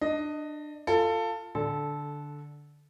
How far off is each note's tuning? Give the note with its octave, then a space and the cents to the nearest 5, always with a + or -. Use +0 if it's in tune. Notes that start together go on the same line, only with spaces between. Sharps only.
D4 +25 D#5 +0
F4 -5 A4 +20
D3 +0 A4 -15